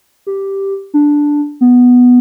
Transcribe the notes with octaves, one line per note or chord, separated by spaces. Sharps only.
G4
D4
B3